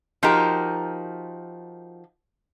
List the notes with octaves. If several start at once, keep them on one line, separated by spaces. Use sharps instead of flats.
F3 D#4 F#4 G4 A#4